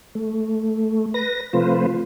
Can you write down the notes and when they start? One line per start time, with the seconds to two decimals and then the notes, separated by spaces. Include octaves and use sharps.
0.15 A3
1.14 B4 A#6
1.53 C3 F3 A3 F4 B4 C5